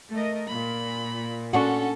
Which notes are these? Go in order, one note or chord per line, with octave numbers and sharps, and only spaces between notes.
A3 A#4 D#5
A#2 B5
C#4 D4 F#4 A4